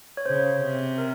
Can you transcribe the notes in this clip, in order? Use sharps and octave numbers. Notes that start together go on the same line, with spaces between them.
C#5
C#3 C5
C3
A#4